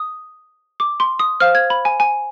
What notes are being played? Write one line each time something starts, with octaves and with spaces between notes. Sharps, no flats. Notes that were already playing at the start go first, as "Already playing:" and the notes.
Already playing: D#6
D6
C6
D#6
C5 F5 F6
G#6
B5
G#5
G#5